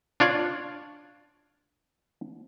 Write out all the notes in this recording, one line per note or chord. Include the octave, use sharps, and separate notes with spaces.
D4 F4 C#5 D5